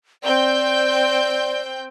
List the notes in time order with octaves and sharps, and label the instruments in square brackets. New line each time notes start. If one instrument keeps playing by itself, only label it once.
[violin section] C4 G5 G6 [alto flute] D5